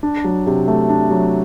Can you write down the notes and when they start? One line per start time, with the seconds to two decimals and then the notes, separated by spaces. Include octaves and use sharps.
0.03 D4
0.24 F#3
0.46 C3
0.68 A3
0.89 D4
1.11 F#3